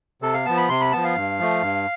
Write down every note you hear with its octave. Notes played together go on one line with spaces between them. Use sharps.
C3 A4
F5
F3 B3 A5
B5
C3 C6
B5
F3 B3 A5
F5
G2
F3 A3
G2